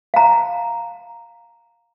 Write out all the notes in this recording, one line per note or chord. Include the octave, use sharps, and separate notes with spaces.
F5 A#5